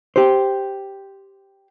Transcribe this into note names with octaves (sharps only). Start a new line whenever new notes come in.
G4 C5